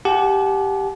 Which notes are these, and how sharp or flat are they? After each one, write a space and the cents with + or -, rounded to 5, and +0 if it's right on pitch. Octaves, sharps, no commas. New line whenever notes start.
G4 +0 F#5 -10 A5 -45